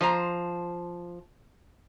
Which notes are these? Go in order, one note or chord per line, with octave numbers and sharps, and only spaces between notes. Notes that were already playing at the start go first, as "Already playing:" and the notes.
F3 C5 A#5